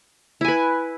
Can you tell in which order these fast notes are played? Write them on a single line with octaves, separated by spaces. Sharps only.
E4 G#5 B4